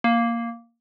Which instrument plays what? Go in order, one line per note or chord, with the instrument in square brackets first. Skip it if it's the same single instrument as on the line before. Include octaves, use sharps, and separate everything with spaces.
[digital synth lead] A#3